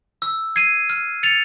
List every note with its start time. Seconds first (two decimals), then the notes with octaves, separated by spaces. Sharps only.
0.22 E6
0.56 G#6 C7 D#7
0.90 F6
1.23 A6 C#7 F7